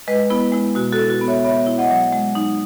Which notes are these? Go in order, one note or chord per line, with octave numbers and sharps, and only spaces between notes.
G#3 B4 D#5
B3 E4
G#3 E4
B2 F#4
F#4 A4
E4
F#4
B3
C#5 E5
B3 C#5 E5
E4
D#5 F#5
F#3
G#3
D#4